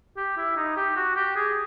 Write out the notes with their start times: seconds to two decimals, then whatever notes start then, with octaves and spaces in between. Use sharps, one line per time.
0.17 G4
0.37 E4
0.57 D#4
0.77 G4
0.96 F#4
1.16 G4
1.36 G#4